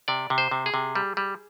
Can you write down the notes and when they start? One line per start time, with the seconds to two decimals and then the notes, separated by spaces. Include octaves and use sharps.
0.08 C3 D5
0.30 C3
0.38 C5
0.51 C3
0.66 G#4
0.74 C3
0.95 G3
1.17 G3